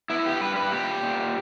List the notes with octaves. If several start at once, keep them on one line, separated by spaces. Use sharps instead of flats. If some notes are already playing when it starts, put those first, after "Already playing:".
B3 E4
G4
G3 B4
B4
A#2 G4
A#2